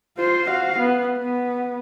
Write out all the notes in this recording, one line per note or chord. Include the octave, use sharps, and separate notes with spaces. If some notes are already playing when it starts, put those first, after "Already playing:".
F4 C5
F#4 F5
B3
B3